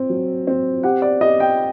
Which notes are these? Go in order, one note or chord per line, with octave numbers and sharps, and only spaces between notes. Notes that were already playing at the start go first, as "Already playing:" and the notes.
Already playing: C4
F#3
C4
G4 F#5
D5
G4 D#5
G5